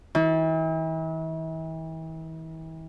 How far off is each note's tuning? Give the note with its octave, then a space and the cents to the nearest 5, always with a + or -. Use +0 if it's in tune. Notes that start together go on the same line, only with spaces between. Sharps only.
E3 -40